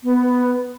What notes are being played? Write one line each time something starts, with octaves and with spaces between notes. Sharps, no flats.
B3